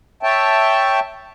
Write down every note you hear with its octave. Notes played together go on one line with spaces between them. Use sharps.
C#5 E5 G5 A5